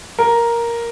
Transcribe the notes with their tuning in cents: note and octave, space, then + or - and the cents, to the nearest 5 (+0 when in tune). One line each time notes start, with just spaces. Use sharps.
A#4 +5